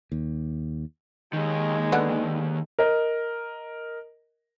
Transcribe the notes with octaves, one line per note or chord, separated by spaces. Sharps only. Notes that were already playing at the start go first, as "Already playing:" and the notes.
D#2
D#2 D#3 G#3
D3 B3 F#5
A#4 D#5